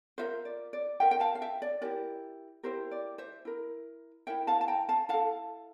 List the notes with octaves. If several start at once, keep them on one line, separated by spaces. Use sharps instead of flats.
F4 A#4 C5 E5
D5
D5
F4 A#4 E5 G5
G5
F5 A5
F5
E5 G5
D5
E4 G4 A#4 D5
E4 G4 A#4 C5
D5
C5 E5
E4 A#4
E4 A#4 E5 G5
F5 A5
A5
G5 A#5
F5 A5
E4 A4 F5 A5